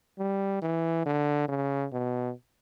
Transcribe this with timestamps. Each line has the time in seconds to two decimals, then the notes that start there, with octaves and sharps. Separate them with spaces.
0.19 G3
0.62 E3
1.05 D3
1.49 C#3
1.93 B2